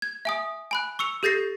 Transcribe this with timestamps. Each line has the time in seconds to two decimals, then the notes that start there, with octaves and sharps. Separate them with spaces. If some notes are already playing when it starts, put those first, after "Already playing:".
0.02 G#6
0.25 E5 G#5 D#6
0.71 G#5 B5 F#6
0.99 C#6 E6 C#7 F7
1.23 G4 A4 G6 A6 A#6 C7